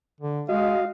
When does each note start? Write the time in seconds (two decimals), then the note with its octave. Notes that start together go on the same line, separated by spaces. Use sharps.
0.20 D3
0.49 G#3 F#4 D#5 F5